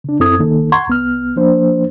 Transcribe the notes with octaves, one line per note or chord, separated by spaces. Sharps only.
C#3 D4
F#2 C4 E4 A4 D#6 G#6
C2 D#3 A#3 D#4 A4
F#5 A#5 C6 C#6 G#6
C2 B3 F6
F3 A#3 D4 C5